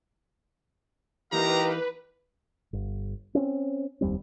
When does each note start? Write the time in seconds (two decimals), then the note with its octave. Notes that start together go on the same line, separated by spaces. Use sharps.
1.32 E3 A#3 D#4 G4 B4 F5 A#5
2.73 G1
3.35 C4 C#4
4.01 F1 D#2 G3 C4